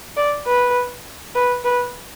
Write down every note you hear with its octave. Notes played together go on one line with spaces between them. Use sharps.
D5
B4
B4
B4